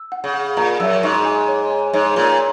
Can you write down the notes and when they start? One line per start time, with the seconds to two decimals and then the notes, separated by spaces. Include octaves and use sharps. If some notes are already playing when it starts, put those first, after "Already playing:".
Already playing: E6
0.12 F#5
0.24 C#3
0.34 F#5
0.57 A#2 A#5
0.80 F#2 E6
1.03 G#2 C#6
1.25 G#5
1.48 C#5
1.71 G#5
1.94 G#2 C#5
2.16 A#2 C#5